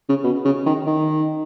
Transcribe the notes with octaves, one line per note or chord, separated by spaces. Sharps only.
C#3
B2
C#3
D#3
D#3